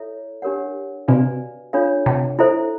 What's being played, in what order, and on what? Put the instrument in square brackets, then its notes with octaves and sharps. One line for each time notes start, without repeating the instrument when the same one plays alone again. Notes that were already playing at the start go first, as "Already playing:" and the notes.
Already playing: [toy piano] E4 A4 C#5 E5
D4 G4 A#4 C#5 F#5
[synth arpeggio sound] C3 [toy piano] F#4 B4 D5 F5 G#5
[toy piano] D4 F4 A4 C#5 F5
[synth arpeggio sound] C3
[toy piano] E4 A4 C5 E5